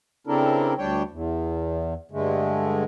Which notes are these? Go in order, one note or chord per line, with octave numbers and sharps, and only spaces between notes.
C#3 C4 D4 E4 A4 A#4
D2 G3 D4 C#5 G5
E2
G2 D3 G#3 A3